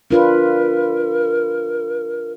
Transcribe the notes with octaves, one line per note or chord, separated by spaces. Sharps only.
D4 F4 A#4 B4